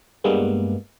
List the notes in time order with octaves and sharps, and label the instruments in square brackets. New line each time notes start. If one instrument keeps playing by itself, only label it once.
[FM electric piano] G2 G3 G#3 A#3 B3